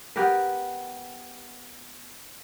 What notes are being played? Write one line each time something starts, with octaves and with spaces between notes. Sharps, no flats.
B3 G4 A#4 B4